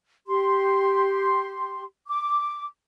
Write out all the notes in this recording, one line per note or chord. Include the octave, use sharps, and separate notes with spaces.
G4 C6
D6